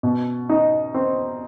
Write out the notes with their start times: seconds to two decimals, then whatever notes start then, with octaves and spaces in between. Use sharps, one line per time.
0.03 B2
0.49 D#4
0.94 C4